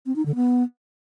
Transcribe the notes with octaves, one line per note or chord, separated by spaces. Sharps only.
C4
D#4
D3
B3